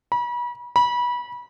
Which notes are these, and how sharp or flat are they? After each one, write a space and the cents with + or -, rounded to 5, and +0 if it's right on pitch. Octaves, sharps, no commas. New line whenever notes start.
B5 -35
B5 -25